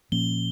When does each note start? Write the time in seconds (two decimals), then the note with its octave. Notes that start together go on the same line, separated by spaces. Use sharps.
0.12 A#2 F3 A#3 C#4 G7